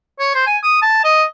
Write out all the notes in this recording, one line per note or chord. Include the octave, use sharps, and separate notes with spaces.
C#5
C5
G#5
D#6
A5
D#5